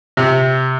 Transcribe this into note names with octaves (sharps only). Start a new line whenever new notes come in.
C3